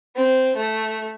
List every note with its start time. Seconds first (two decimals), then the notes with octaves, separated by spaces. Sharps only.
0.16 C4
0.56 A3